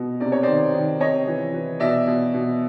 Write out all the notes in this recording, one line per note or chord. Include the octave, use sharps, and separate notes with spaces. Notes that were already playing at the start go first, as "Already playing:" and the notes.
Already playing: B2
C3 D5
C#5
D#3 C5 D5
D#3
C3 C#5 D#5
E3
E3
B2 D5 E5
B2
B2